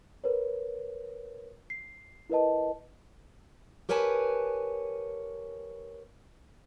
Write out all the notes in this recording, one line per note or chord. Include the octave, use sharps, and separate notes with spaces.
A#4 B4 C#5
C7
E4 A#4 B4 D#5 A5
G4 A#4 B4 C#5 G#5 A5